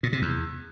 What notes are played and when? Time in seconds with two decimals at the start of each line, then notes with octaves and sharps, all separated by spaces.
0.03 A#2
0.13 C3
0.22 E2